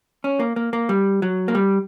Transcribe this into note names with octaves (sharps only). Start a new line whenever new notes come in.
C#4
A#3
A#3
A#3
G3
F#3
A#3
G3